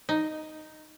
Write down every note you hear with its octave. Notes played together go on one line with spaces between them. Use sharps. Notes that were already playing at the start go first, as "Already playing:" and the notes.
D#4